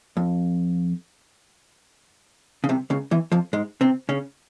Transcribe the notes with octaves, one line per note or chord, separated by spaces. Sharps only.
F2
C#3
C2 C3
C#2 C#3
E2 E3
F2 F3
G#2 G#3
C3 C4
C#3 C#4